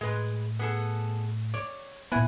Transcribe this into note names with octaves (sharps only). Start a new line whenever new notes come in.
A2 G#3 B4
B3 G#4 A4
C#5 D5
A#2 B3 E4 F#5 G#5